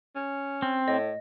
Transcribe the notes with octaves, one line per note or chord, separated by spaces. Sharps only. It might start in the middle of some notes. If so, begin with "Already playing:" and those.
C#4
C4
A2 D#5